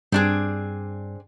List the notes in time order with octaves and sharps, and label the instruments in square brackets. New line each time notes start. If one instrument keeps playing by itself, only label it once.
[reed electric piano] G2 [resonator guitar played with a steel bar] C4 D4 G#4